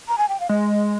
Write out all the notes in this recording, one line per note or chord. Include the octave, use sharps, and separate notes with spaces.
A#5
G#5
G5
F5
G#3 D#5